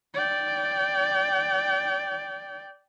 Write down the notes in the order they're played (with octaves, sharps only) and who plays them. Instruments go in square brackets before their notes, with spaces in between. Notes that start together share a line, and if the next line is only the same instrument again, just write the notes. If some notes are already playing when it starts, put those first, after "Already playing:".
[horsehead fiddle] D5 G5